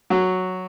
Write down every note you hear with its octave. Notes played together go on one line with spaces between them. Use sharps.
F#3